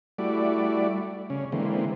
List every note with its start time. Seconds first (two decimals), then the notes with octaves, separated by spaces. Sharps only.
0.18 G3 A3 E4 F#4 D5
1.30 C#3 C#4
1.52 D3 E3 G#3 A#3 C4